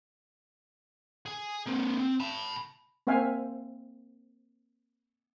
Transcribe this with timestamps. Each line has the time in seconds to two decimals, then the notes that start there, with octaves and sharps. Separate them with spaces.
1.26 G#4 G#5
1.66 A#3 C4
1.99 C4
2.20 A5 B5
3.07 A#3 C4 C5 E5 F5 G#5